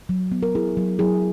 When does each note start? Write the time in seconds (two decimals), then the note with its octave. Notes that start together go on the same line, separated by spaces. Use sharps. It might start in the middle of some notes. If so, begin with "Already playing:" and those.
0.09 F#3
0.32 B3
0.43 A#4
0.55 E4 G#4
0.77 F#3
0.99 F#3 E4 G#4